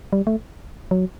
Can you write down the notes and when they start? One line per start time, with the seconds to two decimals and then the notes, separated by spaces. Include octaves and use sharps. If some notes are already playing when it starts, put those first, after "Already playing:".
0.13 G3
0.27 A3
0.91 F#3